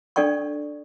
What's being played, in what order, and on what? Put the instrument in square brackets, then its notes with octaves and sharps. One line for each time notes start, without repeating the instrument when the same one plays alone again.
[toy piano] D4 A4 D5 G5 C#6